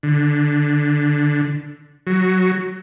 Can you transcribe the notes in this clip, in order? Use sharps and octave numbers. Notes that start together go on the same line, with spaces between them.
D3
F#3